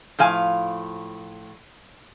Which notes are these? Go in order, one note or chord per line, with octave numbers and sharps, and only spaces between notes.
A2 F3 F5 G#5